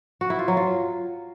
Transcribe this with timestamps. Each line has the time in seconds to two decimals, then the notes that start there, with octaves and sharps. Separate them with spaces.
0.21 F#4
0.30 E4
0.39 F4
0.48 F#3
0.57 F4